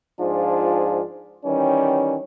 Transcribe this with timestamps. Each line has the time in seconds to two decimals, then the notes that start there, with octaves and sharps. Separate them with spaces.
0.20 G#2 F3 D4 F4 G#4
1.45 D#3 E3 G3 C#4